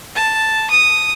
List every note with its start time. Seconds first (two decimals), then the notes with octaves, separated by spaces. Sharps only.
0.16 A5
0.71 D#6